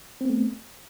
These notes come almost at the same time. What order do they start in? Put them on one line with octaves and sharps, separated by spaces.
C4 B3 A3